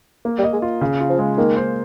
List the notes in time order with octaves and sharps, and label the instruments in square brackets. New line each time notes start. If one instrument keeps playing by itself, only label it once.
[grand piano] A#3
[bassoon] G3
[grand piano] D#5
[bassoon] G#3
[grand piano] F4
C#3
F4
[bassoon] F3
[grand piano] G#3
[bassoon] D#3 [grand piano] A#3
[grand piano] C5